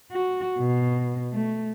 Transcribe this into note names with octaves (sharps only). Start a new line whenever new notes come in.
F#4
B2
A3